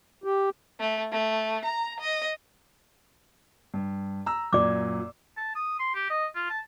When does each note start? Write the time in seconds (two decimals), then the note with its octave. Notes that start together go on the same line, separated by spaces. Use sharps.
0.24 G4
0.80 A3
1.12 A3
1.65 A#5
2.00 D#5
3.74 G2
4.26 A#5 E6
4.53 F#2 A#2 D5 D6 G#6
5.37 A5
5.55 D#6
5.79 C6
5.95 G4
6.10 D#5
6.35 F4
6.50 A5